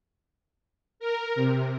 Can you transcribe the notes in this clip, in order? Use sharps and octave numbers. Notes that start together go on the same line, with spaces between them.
A#4
C3